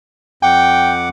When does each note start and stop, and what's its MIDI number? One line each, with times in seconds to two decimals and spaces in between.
0.43 1.09 41
0.43 1.09 78
0.43 0.94 79
0.43 1.09 86